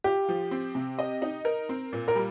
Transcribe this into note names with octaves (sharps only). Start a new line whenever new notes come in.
F4 G4
F3
C4
C3
D#5
D#4
A#4
C4
A#2
A#4
G3